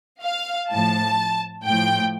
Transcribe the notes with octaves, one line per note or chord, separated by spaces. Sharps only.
F5
A2 F3 A5
A2 F3 G5